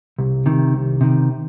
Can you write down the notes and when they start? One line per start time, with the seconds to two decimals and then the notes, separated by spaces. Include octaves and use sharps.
0.19 C2
0.46 C3 D#3
0.74 C2
1.01 C3 D#3